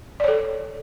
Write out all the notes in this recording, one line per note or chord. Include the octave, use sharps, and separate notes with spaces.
A4 C#5 D5